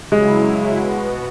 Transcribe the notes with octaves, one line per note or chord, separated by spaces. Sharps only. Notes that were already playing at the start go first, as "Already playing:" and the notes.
C#3 F#3 G#3 E4
B2 B3 F#4